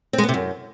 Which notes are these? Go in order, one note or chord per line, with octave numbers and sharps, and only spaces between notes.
C4
G#3
B3
C3
F#2